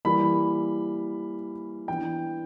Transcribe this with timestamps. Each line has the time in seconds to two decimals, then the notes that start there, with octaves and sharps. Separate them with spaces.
0.05 E3 G3 A#3 B5
1.88 E3 B3 D4 G5